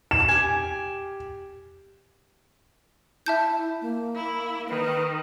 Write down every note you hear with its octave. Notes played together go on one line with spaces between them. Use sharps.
E7
G4 G#5
E4 E5 A5 G6
A#3
E4
D#3 B4